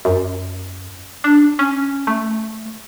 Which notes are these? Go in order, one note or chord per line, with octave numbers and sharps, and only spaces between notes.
F#2
D4
C#4
A3